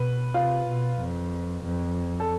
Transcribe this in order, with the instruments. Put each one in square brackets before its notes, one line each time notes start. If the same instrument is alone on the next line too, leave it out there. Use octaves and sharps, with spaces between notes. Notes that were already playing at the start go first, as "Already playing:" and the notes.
Already playing: [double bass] B2 [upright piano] B4
[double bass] C3 [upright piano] F4
[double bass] B2
F2
F2
[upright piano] A4